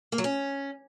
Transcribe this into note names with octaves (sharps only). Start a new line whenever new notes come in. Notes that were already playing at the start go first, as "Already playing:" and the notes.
A#3
F#3
C#4